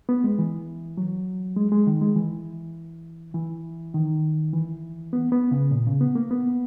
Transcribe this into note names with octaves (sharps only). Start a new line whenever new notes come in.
B3
G#3
E3
F#3
G#3
G#3
D#3
G#3
E3
E3
D#3
E3
B3
B3
C#3
A#2
C#3
B3
A#3
B3